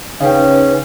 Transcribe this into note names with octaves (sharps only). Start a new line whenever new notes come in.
C#3 C#4 D#4 B4 F5 G5